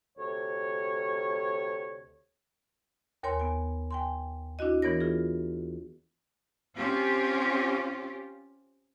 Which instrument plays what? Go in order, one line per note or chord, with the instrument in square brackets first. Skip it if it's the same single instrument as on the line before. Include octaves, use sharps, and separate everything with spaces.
[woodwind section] D2 C3 C#5
[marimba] D#2 A#4 C#5 G#5 C6
B3 G#5
G5 G#5 C6
D4 E4 F#4 D#5
E3 B3 A#4 C#5 A#6
F4 G#4
[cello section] C4 C#4 F4 G4